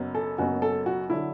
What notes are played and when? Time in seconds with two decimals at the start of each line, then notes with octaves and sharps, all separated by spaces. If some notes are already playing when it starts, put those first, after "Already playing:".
Already playing: F#1 F#2 F#3 B3
0.15 A4
0.38 F#1 F#2 F#3 B3 F#4
0.62 A4
0.86 F#4
1.10 D3 F#3 E4